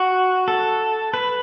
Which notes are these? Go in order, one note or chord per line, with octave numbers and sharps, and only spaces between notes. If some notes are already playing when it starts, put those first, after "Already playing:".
Already playing: F#4
A4
B4